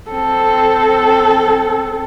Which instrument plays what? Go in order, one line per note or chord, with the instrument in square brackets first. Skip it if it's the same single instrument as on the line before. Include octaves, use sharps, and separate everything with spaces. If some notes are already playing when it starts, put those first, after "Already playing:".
[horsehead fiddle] C4 A4